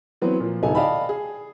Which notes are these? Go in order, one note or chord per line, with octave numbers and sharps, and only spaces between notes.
E3 F#3 B3 C4
A#2 F3
D1 C2 B3 D#4 A4 G#5
D5 D#5 F5 G5 A5 B5
G#4